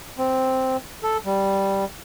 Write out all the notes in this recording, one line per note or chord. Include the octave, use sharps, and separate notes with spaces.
C4
A4
G3